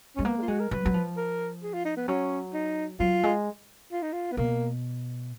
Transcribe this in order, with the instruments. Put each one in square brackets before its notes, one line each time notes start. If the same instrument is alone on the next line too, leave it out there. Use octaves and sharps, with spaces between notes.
[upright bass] G#3 [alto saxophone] C#4
[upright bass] A#3 [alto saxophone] B3
[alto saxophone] G#3
F4
[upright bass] G#3 [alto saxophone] F#4
[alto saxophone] A#4
[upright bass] F#3 [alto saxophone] B4
[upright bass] F#3
F3
[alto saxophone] A#4
G#4
F4
D#4
B3
[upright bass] F#3 [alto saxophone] C#4
[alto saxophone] D#4
[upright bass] F#3 [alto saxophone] F4
[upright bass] G#3
[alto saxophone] F4
D#4
F4
B3
[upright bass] B2 [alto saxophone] A#3